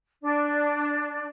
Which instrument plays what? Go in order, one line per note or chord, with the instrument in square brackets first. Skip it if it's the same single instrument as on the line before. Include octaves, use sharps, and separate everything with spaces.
[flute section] D4